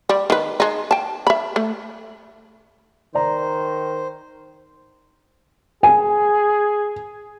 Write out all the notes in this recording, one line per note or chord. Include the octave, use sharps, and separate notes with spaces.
G3
D#3 B4
G#3 D#4
G5 A5
E5 B5
A3
D#3 C5 D5 A#5
G#4 G#5